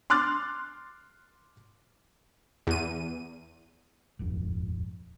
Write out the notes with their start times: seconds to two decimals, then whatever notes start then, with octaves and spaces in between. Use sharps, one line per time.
0.10 C6 D6 F6 F#6 A6
2.67 E2 D#7
4.19 D#1 G#1 F2